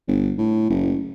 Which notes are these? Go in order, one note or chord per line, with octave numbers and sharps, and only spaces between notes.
G1
A2
F#1